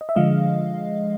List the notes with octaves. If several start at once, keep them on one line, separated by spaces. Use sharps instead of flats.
D#5
E5
D3 F3 G#3 D#5 F5